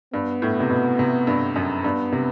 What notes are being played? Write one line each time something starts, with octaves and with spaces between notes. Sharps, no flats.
G2 B3
A2
C3
B2
C3
G2
F#2
G2 B3
C3